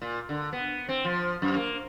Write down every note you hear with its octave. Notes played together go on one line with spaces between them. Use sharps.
A#2
D3
B3
C4
F3
F#2
A#3